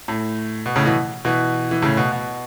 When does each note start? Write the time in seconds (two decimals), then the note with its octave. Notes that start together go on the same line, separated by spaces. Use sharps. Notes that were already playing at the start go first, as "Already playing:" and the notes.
0.08 A2
0.66 B2
0.76 A2 C#3
0.85 B2 E3
1.25 B2 E3
1.71 E3
1.82 A2 C#3
1.97 B2
2.12 B2